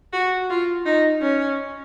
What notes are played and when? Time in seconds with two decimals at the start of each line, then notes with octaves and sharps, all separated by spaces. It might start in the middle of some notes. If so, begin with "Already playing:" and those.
0.13 F#4
0.50 F4
0.86 D#4
1.22 C#4